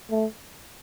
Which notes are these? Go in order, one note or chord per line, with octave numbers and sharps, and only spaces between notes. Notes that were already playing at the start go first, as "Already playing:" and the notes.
A3